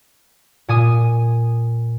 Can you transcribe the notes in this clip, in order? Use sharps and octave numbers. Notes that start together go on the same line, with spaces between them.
A#2 G#5 D#6